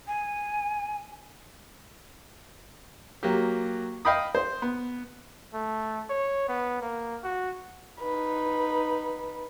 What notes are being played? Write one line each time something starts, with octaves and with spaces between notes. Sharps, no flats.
G#5
F#3 A#3 G4
D#5 F5 G5 B5 D#6
C5
B3
A3
C#5
B3
A#3
F#4
D#4 B4